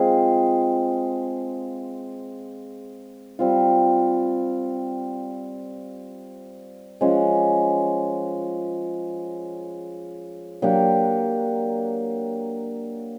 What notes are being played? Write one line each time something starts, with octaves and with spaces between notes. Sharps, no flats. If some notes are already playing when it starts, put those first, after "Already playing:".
Already playing: G#3 C4 F4 G#4
G3 C4 F4
F3 G#3 C#4
F#3 A#3 D4 G4